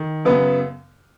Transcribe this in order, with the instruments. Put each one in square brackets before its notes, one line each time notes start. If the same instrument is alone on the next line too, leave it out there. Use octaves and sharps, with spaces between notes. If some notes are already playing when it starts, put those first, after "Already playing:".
Already playing: [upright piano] D#3
F#2 C#3 B3 B4